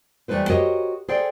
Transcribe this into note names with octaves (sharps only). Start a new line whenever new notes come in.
E2 G3 A3 D#4 B4 C5
F#4 G4 A#4 C5 C#5 D#5
G#4 A4 C5 D5 G5